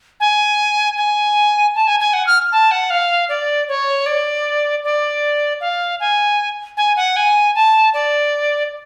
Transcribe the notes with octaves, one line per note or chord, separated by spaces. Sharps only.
G#5
G#5
A5
G#5
G#5
F#5
F6
A5
F#5
F5
D5
C#5
D5
D5
F5
G#5
G#5
F#5
G#5
A5
D5